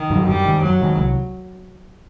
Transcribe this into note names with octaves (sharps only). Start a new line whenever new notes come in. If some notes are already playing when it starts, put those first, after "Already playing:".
Already playing: D#3
G2 D3 F#3
F#2 G3
D#3 G#3
F#2 F#3
D#3 G#3
C2